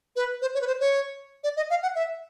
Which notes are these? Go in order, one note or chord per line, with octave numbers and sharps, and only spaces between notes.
B4
C5
C#5
B4
C5
C#5
D5
D#5
F5
F#5
E5